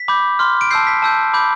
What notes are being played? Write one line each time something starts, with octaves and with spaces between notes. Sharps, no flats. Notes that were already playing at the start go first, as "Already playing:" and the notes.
Already playing: B6
B5 D6 G6
C6 F6
D7
A5 E6 G6 C7
B6
A5 E6 G6
B5 D6 G6